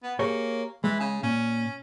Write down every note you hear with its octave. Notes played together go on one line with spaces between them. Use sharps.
B3
A#3 G4 G#4 C#5
E3 G#3
C#3
A#2 C#4